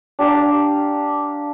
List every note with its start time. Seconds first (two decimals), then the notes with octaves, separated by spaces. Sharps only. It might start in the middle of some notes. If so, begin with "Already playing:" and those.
0.19 D4 G4 F5 A#5